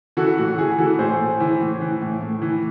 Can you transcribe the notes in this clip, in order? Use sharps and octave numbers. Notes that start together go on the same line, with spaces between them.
E3 F#4 A4
A2 F#4
E3 G#4
E3 F#4 A4
A2 G#4 C5
A2
E3
A2
E3
A2
A2
E3